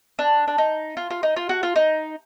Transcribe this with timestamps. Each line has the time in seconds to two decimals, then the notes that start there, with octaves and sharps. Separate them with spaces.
0.19 D4
0.48 D4
0.58 D#4
0.97 F4
1.10 F4
1.23 D#4
1.36 F4
1.49 F#4
1.63 F4
1.76 D#4